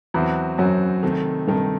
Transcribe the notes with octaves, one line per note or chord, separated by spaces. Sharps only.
E2 F#3 C4 F#4
F#2 F#3 C4 F#4
C3 D#3 A3 D#4
G2 C3 D#3 A3 D#4